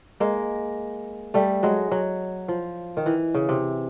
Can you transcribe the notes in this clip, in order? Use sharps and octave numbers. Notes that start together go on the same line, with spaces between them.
G#3 A#3
G3 A3
F#3 G#3
F#3
F3
D#3
E3
C#3
C3